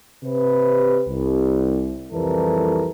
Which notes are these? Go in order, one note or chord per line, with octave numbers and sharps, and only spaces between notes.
C3 B4
C2
C2 F2 E3 G3 A4 A#4